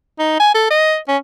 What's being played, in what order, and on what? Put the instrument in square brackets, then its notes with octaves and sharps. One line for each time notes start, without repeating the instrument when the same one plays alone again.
[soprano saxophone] D#4
G#5
A4
D#5
C#4